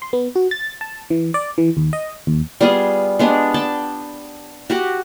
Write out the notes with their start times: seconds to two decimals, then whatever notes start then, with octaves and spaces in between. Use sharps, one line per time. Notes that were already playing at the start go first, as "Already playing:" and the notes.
0.02 C6
0.13 B3
0.35 F#4
0.51 A6
0.81 A5
1.10 E3
1.34 D5
1.58 E3
1.77 D#2
1.93 D#5
2.27 D#2
2.61 G3 B3 F4 G#4
3.19 G#3 B3 D4 G4
3.54 D5 G5 A5
4.70 F#4 G4 F#5